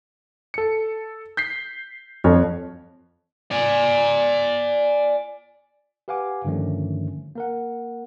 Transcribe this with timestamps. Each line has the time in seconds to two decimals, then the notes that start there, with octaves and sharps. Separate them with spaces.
0.54 A4 C#7
1.37 G6 B6 C7
2.24 F2 C#5
3.51 D5 G#5
6.08 G4 B4 F5 F#5 G#5 D6
6.45 G2 D3 D#3 F3 A3 C#4
7.35 A#3 A#4 F#5